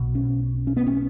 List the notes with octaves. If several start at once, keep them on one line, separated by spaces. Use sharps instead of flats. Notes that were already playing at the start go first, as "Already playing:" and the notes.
Already playing: B1 B2
C#4
C#4
B3
C#4